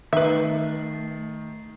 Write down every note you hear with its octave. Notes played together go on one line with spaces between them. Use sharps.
D#3 A3 B4 E5